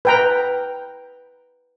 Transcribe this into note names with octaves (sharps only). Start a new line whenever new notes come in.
B4 G5 A#5